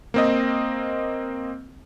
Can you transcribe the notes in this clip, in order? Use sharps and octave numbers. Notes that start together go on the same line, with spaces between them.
A#3 C4 D#5